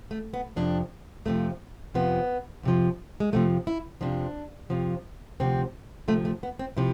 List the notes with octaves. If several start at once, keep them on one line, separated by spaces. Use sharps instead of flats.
A3
B3
F2 C3 F3 D4
F2 C3 F3 A3
F2 C3 F3 B3
F2 C3 F3
G#3
F2 C3 F3 A3
E4
F2 C3 F3 D4
F2 C3 F3
D2 C3 F3 C4
D2 C3 F3 A3
A3
B3
C4
C3 F3 E4